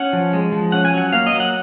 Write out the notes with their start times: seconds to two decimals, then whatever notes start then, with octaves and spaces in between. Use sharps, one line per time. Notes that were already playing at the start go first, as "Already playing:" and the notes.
Already playing: C#4 F#5
0.13 F3
0.33 G#3
0.52 F3
0.72 C#4 F#5
0.85 G#5
0.93 F#3 F#5
1.13 A#3 F5
1.27 D#5
1.33 F#3
1.40 F#5